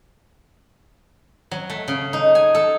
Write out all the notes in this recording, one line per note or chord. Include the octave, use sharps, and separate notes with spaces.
F#3
A3
C#3
D#4
G#5
A4